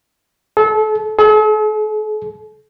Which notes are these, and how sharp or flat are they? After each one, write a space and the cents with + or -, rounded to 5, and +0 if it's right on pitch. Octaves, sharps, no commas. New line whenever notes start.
A4 -30
A4 -45